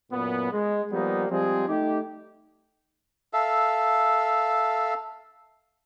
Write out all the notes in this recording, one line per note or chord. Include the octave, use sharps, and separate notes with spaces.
F#2 A#2 B3
G#3
F3 G3 A#3 B3 D#4
F3 G3 G#3 C4 G#4
A3 D#4 G4
A4 E5 F5